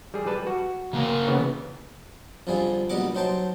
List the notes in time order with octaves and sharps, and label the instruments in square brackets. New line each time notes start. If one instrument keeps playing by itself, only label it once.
[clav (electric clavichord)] G3 G#4
G3 B4 A5
F#4
[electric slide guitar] C#3 A#3 A#4
[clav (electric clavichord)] C#3 E3 B3
[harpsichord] F2 D3 F3 G3 G#4
A#1 B2 G3 D#5 F#5 D6
F#3 D#4 C5 G5 A5 C6